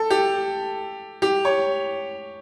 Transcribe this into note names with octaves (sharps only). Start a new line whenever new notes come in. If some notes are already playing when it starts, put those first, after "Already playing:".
Already playing: A4
G4
G4
C#5